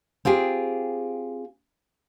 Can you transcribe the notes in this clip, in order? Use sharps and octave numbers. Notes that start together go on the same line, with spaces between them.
C4 F4 G4 G#4